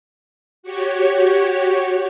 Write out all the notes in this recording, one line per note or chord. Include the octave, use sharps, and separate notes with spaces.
F#4 G4 C#5